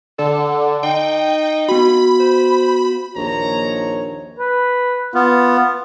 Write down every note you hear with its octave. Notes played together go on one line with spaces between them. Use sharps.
D3 A4
D#4 G5
B3 F#4 B5
C5
A#1 D#2 D#3 C#5 A#5
B4
B3 F4